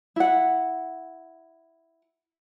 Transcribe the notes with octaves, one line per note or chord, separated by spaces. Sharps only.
E4 F#5